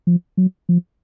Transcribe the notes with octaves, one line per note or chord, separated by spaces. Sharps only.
F3
F#3
F3